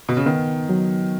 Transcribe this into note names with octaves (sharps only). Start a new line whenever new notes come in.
B2
C#3
D#3 B3
F#3